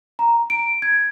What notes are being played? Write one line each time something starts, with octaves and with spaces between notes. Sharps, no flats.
A#5
D7
G#6